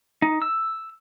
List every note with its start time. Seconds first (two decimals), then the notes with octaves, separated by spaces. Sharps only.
0.22 D#4
0.42 E6